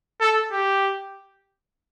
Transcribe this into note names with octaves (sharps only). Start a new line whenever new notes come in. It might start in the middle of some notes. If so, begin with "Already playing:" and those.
A4
G4